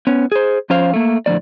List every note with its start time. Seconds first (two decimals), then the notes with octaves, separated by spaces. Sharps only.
0.07 B3 C#4
0.32 G#4 C5
0.70 F3 C#4 C5 F5
0.94 A3 A#3
1.26 A2 D3 F3 A3 D5